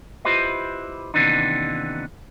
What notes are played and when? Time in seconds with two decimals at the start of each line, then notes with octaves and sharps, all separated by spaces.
0.25 E4 F4 G4 B4 C5 D#5
1.14 D#2 C3 E3 B3 D4 D#4